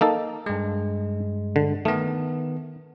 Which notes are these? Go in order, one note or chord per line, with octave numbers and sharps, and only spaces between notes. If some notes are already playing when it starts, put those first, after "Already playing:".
A#3 D#4 A4
G2 G#3
D3
D#3 A3 B3